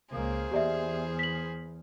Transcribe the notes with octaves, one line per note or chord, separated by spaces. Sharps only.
C#2 A#3 G#4 C5
E2 G4 D5 E5
B6 F#7